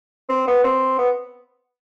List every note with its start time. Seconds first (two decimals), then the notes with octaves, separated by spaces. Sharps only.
0.29 C4
0.48 B3
0.64 C4
0.99 B3